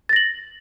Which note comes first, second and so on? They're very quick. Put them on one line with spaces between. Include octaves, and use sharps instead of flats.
A6 A#6 F#7